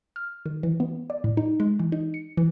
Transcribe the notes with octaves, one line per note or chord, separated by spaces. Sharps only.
F6
D#3
E3
B3
D5
A2
D#4
G#3
E3
D#4
C#7
E3